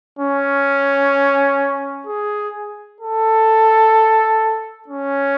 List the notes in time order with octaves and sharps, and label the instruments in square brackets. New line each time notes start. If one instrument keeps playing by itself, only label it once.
[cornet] C#4
G#4
A4
C#4